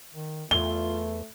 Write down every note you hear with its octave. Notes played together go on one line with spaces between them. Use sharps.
D#3
E2 A3 F4 G7